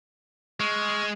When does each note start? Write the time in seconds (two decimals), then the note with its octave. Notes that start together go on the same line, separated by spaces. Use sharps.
0.60 G#3 C#6 F6